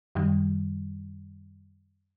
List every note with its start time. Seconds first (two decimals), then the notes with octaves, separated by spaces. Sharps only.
0.15 F#2 D#3 G3